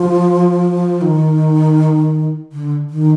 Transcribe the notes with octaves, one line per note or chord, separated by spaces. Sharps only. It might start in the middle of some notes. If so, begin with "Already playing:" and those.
Already playing: F3
D#3
D3
D#3